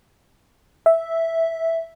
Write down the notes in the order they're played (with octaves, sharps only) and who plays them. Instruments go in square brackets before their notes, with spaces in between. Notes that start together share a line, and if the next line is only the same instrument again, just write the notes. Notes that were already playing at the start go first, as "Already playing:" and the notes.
[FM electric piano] E5